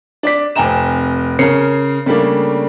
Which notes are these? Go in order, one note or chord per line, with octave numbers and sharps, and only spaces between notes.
D4 D5 B6
F1 C4 G5 G#5 A#5 E7
C#3 C#4 A#4 C7 C#7
C#3 G3 A3 A#3 D4